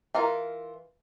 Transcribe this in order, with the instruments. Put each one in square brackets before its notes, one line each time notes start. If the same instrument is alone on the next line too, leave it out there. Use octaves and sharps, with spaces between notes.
[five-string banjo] E3 F4 A#4